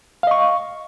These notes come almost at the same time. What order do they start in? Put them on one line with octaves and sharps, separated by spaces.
F5 D#5 C#6